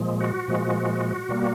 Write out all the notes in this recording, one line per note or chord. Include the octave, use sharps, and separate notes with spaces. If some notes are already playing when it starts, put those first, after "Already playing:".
Already playing: A#2 F3 G#3
F#4
A#2 F3 G#3
B2 G3 A#3